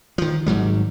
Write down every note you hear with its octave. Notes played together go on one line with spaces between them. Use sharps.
D#3 F3
G#1 G#2 F#3 G3